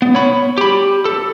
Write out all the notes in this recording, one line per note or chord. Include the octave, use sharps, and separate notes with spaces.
B3
C#5 B5
G4 B5
A4